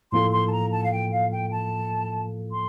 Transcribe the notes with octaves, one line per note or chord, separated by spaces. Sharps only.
A2 F3 A#3 F4 A4 C6
C6
A5
A#5
A5
F5
G5
F5
G5
A5
C6